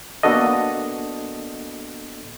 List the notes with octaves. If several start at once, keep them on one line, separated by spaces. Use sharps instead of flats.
A#3 B3 D4 F#4 A4 D#5